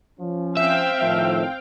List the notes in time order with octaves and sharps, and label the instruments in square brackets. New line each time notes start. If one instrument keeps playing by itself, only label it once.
[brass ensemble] F3 C#4
[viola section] C4 F5 G5 [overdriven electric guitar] E5
[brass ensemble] A2 D#3 F3